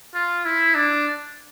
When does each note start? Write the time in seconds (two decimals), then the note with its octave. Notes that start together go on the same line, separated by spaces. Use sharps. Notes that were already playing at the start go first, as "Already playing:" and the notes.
0.15 F4
0.45 E4
0.75 D4